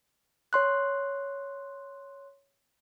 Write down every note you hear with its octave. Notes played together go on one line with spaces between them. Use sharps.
C#5 C6 F#6